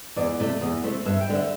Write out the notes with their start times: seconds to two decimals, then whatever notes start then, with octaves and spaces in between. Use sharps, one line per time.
0.16 E2 D5
0.40 C3 A3
0.61 E2
0.83 C3 A3
1.05 G2 E5
1.20 G5
1.28 D3 G3
1.35 E5